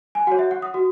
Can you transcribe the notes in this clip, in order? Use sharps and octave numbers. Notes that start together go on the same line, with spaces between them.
G#5
F#4 C#5 F#5
E5
F#5
D#6
F#4